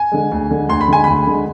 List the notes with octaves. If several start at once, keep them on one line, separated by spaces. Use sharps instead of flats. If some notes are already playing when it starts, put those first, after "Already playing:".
Already playing: G#5
D3 G#3
D2
D3 G#3
D2 C6
B5
D3 G#3 G#5
D2 B5
D3 G#3